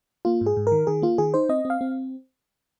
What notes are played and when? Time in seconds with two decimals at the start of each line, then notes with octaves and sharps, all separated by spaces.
0.25 A#3 F4
0.41 G#2
0.46 G#4
0.57 G#2
0.67 A#4
0.72 D#3
0.87 D#3 G#4
1.02 A#3 F4
1.18 D#3 G#4
1.34 D#4 C5
1.49 C4 D#5
1.65 C4
1.70 F5
1.81 C4